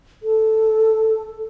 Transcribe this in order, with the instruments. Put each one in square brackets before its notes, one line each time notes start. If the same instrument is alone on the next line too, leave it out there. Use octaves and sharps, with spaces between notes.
[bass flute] A4